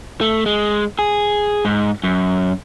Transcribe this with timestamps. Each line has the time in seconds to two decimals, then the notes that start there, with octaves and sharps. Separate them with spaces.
0.21 A3
0.46 G#3
0.99 G#4
1.65 G#2
2.04 F#2